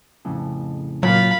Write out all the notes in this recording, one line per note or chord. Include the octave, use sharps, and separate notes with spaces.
F2 A2 C#3
A#2 F#3 F5 B5